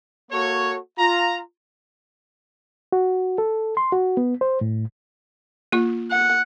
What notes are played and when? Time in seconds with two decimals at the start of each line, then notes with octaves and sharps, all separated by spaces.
0.31 A#3 F#4 A4 C#5
0.98 F4 A#5
2.92 F#4
3.38 A4
3.77 C6
3.92 F#4
4.17 B3
4.41 C5
4.61 A2
5.72 A#3 F4
6.11 F#5